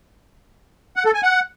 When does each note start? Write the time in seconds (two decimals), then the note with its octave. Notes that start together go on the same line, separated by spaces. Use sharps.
0.96 F#5
1.05 A4
1.14 G#5
1.23 F#5